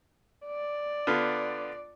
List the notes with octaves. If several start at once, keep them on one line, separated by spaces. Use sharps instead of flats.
D5
D3 B3 F4